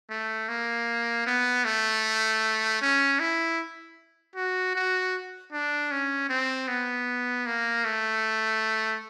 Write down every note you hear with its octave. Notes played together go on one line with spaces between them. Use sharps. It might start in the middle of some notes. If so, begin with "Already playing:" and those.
A3
A#3
B3
A3
C#4
E4
F#4
F#4
D4
C#4
C4
B3
A#3
A3